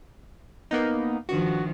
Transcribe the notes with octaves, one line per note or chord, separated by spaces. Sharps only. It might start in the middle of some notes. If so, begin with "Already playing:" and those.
A#3 B3 D#4
G2 D#3 F3 F#4